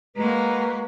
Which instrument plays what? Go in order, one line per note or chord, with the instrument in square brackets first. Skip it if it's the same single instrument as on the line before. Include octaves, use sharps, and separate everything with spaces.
[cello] G#3 A#3 [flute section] F#4 B4 A#5